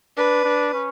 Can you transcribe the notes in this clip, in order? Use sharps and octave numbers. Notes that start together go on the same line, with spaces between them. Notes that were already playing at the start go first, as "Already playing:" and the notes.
D4 B4
D4
C#4